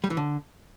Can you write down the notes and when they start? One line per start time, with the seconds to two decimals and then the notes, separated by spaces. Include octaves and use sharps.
0.04 G3
0.10 E3
0.17 D3